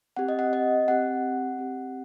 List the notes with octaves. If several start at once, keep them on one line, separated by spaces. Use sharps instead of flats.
C4 G4 F#5
D#5
F#5
D#5
C4 G4 F#5
C4 G4